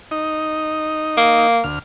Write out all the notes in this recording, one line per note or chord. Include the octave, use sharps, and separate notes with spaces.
D#4
A#3
D2 F6